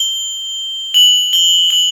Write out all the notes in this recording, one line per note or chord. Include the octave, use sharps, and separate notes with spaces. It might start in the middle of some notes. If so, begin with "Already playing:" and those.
Already playing: G7
F#7
G7
F#7